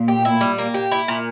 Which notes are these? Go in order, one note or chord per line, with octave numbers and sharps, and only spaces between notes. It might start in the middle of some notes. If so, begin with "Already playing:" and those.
Already playing: A#2
G4
E4
G3
A#3
G4
E4
A#2